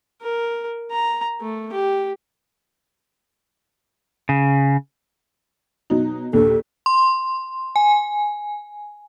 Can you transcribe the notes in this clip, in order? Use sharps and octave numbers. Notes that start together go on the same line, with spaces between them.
A#4
A#5
A3
G4
C#3
B2 F#3 D#4
A#1 D#2 A4
C6
G#5